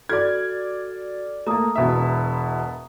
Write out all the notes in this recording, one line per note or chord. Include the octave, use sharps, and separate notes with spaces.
F#4 A4 D5 F6 G#6
A3 A#3 A#5 D#6
E1 B2 E5